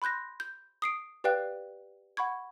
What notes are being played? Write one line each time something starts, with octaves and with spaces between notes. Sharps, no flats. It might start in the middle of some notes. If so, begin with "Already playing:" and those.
B5 C6 F#6 G6 A#6
G6
D#6 C7 D7
G4 B4 D5 F5 G5 F#6
F#5 B5 C#6 G#6